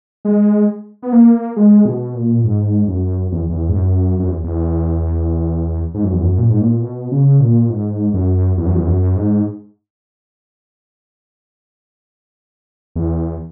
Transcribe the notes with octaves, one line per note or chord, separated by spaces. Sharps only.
G#3
B3
A#3
G#3
B2
A#2
G#2
F#2
E2
E2
G#2
F#2
F#2
E2
E2
G#2
F#2
E2
F#2
A#2
G#2
A#2
B2
C#3
A#2
G#2
F#2
E2
F#2
E2
F#2
G#2
E2